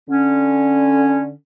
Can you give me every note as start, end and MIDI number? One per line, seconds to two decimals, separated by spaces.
0.09 1.32 50
0.09 1.32 61